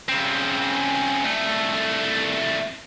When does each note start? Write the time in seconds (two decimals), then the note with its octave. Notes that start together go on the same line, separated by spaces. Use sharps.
0.09 C#3 C4
1.24 C2 A3